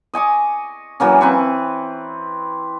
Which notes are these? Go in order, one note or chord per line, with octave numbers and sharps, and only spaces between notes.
D#5 G#5 C#6 D6
E3 F#3 A#3 C#4
C4 B4 C#6